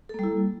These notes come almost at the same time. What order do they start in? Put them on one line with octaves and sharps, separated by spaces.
A4 A#3 G3 E4